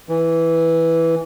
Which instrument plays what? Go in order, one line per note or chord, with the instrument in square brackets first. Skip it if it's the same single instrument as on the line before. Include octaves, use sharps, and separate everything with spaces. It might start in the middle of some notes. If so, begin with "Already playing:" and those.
[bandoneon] E3